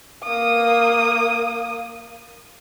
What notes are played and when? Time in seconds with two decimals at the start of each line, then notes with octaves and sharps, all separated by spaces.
0.24 A#3 D#6